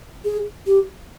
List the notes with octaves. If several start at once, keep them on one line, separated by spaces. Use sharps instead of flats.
G#4
G4